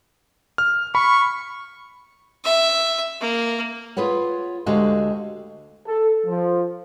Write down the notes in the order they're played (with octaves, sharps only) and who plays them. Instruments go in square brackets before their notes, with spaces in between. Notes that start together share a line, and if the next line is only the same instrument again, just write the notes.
[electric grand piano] F6
[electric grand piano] B5 [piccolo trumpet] C#6
[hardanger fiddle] E5
A#3
[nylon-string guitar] F4 G#4 B4 C#5 F#5
D2 D3 G#3 F#4 G4 F5
[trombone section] A4
F3